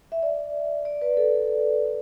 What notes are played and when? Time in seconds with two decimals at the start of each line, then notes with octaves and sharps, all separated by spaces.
0.12 E5
0.23 D5
0.85 D5
1.01 B4
1.17 A4